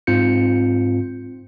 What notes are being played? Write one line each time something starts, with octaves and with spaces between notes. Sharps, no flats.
G#2 C4 F4 G6 C#7